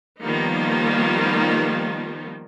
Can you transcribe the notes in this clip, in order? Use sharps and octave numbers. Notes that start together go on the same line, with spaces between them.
D#3 F3 G3 A#3 B3 D#4